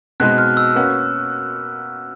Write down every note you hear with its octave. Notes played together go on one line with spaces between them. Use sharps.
B2 G#3 C4 D#4 F#6
F6
E6
A#3 C#4 F#4 B4